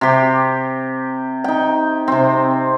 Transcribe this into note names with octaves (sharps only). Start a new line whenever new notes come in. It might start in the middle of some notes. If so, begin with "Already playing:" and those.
C3 G4
D#4 G5
C3 C4